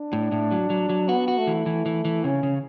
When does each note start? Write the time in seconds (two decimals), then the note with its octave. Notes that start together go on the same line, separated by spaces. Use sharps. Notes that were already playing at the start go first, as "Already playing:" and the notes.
Already playing: D4
0.13 A2
0.32 A2
0.51 F#3
0.70 F#3
0.89 F#3
1.09 B3 F#4
1.28 F#4
1.38 A3
1.47 E3
1.66 E3
1.86 E3
2.05 E3
2.24 C#3 C#4
2.43 C#3